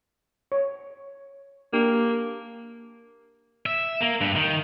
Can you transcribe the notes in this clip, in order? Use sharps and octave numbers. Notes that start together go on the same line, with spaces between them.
C#5
A#3 D4 G4
E5
A#3
G2
D#3